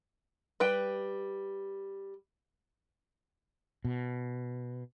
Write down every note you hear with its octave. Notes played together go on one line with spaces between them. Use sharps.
G3 B4 G5
B2